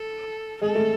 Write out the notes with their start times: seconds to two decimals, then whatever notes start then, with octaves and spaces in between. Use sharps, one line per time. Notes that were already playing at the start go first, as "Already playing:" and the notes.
Already playing: A4
0.61 G#3 A4
0.75 A3